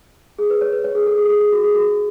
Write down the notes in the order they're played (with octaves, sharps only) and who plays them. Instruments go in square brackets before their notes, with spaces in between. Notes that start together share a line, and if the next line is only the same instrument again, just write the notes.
[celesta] G#4
B4
C#5
B4
C#5
G#4
A4
G#4
A4
G#4
G#4
F#4
G#4
F#4